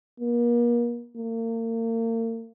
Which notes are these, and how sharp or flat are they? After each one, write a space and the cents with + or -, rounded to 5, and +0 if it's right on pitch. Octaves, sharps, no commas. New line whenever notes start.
A#3 +35
A#3 -40